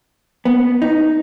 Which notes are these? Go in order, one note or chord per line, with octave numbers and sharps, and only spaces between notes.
B3
D#4